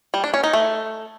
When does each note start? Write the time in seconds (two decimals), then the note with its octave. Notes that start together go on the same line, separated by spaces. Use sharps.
0.14 G3
0.24 D4
0.34 C#4
0.43 D#4
0.53 A3